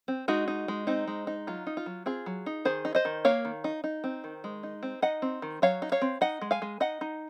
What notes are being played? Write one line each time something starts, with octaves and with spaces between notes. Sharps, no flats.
C4
G#3 D#4 F#4
D#4
G#3
C4 D#4
G#3
D#4
F#3 F4
D#4
F4
F#3
C4 F4 G#4
F#3
D#4
D#3 G#4 C5
D#4
C5 D#5
D#3
A#3 C#5 F5
D#3
D#4
D#4
C4
D#3
G#3
D#4
C4
D#4 D#5 F#5
C4
D#3
F#3 C#5 F5
D#4
C#5 F5
C4
D#4 D#5 F#5
G#3
F5 G#5
G#3
D#4 D#5 F#5
D#4